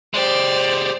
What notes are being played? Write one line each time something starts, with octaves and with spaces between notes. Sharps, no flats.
G#3 G4 C5 D5